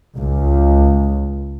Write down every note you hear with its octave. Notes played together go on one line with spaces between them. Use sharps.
C#2